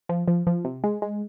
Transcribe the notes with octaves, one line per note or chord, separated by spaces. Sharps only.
F3
F3
F3
C3
G#3
G#3